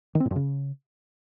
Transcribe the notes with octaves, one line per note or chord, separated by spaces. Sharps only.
D#3
C4
A2
F#2
C#3